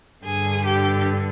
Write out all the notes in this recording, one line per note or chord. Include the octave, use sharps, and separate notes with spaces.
G2 D3 G#4
G4